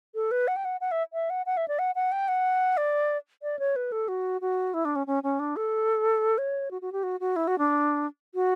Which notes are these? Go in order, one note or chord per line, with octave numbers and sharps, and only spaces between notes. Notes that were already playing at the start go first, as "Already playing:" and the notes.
A4
B4
F#5
G5
F#5
F#5
E5
E5
F#5
F#5
E5
D5
F#5
F#5
G5
F#5
D5
D5
C#5
B4
A4
F#4
F#4
E4
D4
C#4
C#4
C#4
D4
A4
C#5
F#4
F#4
G4
F#4
F#4
E4
F#4
D4
F#4